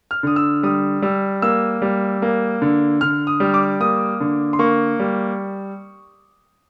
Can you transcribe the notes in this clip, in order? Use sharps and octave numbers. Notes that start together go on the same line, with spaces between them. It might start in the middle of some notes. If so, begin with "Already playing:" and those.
F6
D3 D#6
E6
G3 D#6
G3 E6
A#3 E6
G3
A#3
D3
D3 F6
D#6
G3
D6
A#3 D#6
D3
C6
A#3 C#6
G3